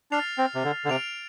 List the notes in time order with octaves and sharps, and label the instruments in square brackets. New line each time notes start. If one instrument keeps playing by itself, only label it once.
[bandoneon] D4 [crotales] F6 A6 C7 F7
[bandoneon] C4
C3
D3
D3
[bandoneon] C3 [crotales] F6 D7 F7